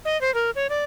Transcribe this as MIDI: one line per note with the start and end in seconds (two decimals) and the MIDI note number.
0.05 0.20 75
0.21 0.33 72
0.34 0.50 70
0.55 0.67 73
0.70 0.84 74